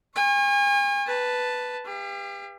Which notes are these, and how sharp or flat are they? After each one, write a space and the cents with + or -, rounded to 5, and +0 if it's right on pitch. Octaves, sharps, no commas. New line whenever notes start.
G#5 -40 C#6 -35
B4 +0 A5 +0
G4 +35 F5 -40